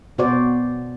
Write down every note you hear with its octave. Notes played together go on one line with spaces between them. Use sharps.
B2 F#4 C5 D5